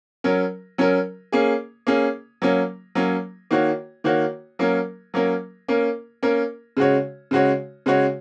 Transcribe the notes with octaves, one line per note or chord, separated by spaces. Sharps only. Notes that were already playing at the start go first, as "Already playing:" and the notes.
F#3 C#4 A#4
F#3 C#4 A#4
A#3 C#4 G#4
A#3 C#4 G#4
F#3 A#3 C#4
F#3 A#3 C#4
D#3 A#3 F#4 C#5
D#3 A#3 F#4 C#5
F#3 A#3 C#4 A#4
F#3 A#3 C#4 A#4
A#3 C#4 A#4
A#3 C#4 A#4
C#3 G#3 F#4 C#5
C#3 G#3 F#4 C#5
C#3 G#3 F#4 C#5